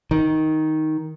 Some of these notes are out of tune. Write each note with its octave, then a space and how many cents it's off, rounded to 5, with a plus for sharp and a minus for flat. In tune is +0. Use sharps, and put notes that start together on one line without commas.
D#3 +5